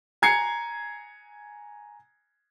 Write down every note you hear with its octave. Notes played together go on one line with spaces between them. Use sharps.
G#5 A#5 G#6 C7 C#7